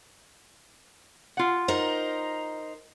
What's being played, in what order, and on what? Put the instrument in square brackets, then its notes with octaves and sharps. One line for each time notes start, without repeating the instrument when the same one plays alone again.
[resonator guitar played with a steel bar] F4 F#5
[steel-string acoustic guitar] D#4 A#4 C5